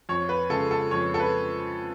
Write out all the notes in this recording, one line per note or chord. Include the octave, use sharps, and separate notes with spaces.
F2 C#5
B4
C#3 G#3 A4
A4
F2 C#5
A4
B4